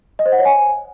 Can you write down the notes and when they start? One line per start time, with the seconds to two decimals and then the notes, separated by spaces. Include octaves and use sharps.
0.19 D#5
0.26 C5
0.32 F#5
0.39 C#5
0.45 G#5